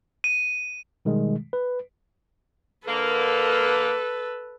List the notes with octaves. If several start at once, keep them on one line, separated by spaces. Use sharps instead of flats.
D#7
B2 D#3 G3 G#3
B4
D3 A#3 A4 B4